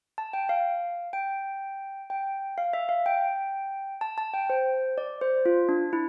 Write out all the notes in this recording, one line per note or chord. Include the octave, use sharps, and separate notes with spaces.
A5
G5
F5
G5
G5
F5
E5
F5
G5
A5
A5
G5
C5
D5
C5
F4
D4
E4